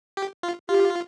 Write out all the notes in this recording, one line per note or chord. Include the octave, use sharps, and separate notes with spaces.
G4
F4
F4 G4